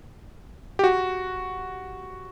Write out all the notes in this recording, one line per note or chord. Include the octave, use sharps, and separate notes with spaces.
G4
F#4